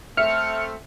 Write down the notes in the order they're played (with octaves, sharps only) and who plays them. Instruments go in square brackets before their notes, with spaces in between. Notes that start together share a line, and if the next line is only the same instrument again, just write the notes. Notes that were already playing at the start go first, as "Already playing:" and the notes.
[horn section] A3 C4 [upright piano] E5 [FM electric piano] F6 C#7